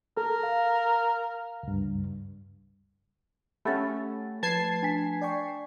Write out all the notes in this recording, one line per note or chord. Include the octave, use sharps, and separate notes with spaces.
A4 A#4
F5
C#2 G2
A3 C#4 G4 F#5 B5 A6
F3 A3 B4 A5 G#6 C7
D4 G#5 B6
D5 G5 C#6